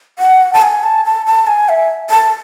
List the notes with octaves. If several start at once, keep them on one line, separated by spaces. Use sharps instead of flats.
F#5
A5
G#5
A5
A5
A5
G#5
E5
A5